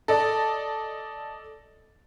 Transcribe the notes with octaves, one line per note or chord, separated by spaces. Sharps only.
A4 D5 D#5